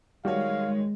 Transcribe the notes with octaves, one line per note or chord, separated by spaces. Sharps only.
D#3 G3 G#3 F#4 C#5 F5